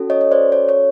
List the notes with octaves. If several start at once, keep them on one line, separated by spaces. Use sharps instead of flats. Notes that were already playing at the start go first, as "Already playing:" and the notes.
Already playing: C#4 F#4 A4
C#5 D#5
C#5
C5 D5
C#5
C#5